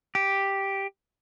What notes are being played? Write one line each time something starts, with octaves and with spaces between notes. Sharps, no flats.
G4